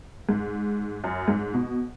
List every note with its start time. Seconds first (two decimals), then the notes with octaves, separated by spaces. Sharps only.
0.29 G#2
1.04 F#2
1.28 G#2
1.54 B2